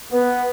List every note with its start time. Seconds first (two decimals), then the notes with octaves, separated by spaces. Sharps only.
0.12 B3